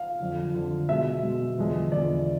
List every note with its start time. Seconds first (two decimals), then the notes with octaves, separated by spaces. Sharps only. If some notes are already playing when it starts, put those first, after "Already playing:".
Already playing: F5
0.20 F2 D3 F3
0.54 F2 D3 F3
0.88 B2 G#3 E5
1.23 B2 G#3
1.58 E2 D3 F3 G#3
1.92 E2 D3 F3 G#3 D5